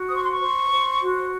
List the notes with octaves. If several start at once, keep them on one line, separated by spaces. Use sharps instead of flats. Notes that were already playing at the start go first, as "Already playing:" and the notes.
Already playing: F#4
C5 D#6
C#6
C6
C#6
C5
C5
F#4